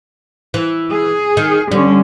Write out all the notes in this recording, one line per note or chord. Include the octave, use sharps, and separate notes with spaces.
E3
G#4
D#3
D3 G3 C#4